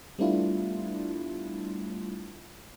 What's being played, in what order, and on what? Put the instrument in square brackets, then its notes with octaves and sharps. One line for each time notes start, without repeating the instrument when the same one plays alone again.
[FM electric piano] G3 A3 B3 D4 E4 F4